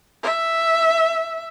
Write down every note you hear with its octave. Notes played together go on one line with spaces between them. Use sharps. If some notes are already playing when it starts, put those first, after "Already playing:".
E5